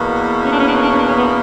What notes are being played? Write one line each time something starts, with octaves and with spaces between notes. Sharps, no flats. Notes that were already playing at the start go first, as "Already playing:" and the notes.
Already playing: E2 B2 A#3
C#4
D4
C#4
D4
C#4
D4
C#4
D4
C#4
B3